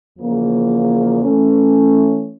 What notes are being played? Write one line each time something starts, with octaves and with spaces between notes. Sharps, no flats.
E2 C#3 F3 A#3
E3 A3 C#4